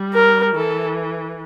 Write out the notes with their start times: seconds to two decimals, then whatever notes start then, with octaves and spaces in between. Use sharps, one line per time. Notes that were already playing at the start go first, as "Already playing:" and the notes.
Already playing: G3
0.13 A#4
0.56 E3 A4